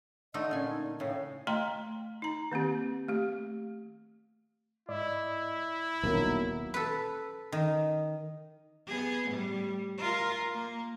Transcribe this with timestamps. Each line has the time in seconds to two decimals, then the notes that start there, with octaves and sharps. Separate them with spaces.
0.34 D3 A3 D#4 D#5
0.51 A#2 C#4 G#5
0.68 D#4
1.00 A2 C#3 C#5
1.47 A3 D#5 G5 A#5 C6
2.22 D#4 A#5
2.52 D#3 A#3 C4 G4
3.08 A3 G4
4.89 G#2 E4 D5 D#5
6.03 D#1 B1 F#3 A#3 F#4 A#4
6.74 A4 B4
7.52 D#3
8.87 B3 G#4
9.28 A2 G3
9.98 F4 A#4
10.54 A#3